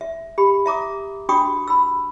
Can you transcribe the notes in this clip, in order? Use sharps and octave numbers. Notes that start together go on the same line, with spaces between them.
E5
G4 B5
E5 A#5 D6 D#6
D4 F#4 G5 B5 C#6 D#6
B5 E6